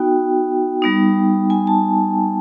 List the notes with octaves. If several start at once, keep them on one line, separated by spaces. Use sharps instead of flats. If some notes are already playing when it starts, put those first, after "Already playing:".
Already playing: B3 D#4 F#4 G5
G3 B3 D#4
G#5
A5